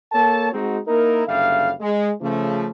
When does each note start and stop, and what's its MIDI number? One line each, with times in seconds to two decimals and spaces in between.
0.13 0.51 58
0.13 0.51 69
0.13 0.51 73
0.13 0.51 81
0.53 0.78 56
0.53 0.78 60
0.53 0.78 63
0.53 0.78 66
0.87 1.25 58
0.87 1.25 63
0.87 1.25 64
0.87 1.25 70
1.28 1.72 30
1.28 1.72 50
1.28 1.72 55
1.28 1.72 76
1.28 1.72 77
1.81 2.11 56
2.22 2.69 49
2.22 2.69 53
2.22 2.69 57